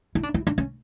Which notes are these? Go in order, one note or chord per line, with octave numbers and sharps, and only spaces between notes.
E4
D4
E4
D4
C#4